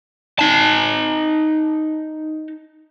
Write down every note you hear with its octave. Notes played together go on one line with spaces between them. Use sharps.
D#4 A5